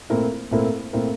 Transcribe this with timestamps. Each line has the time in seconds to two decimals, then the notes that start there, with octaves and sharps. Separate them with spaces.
0.10 A#2 A3 C4 E4 A#4
0.51 A#2 A3 C4 E4 A#4
0.93 A#2 A3 C4 E4 A#4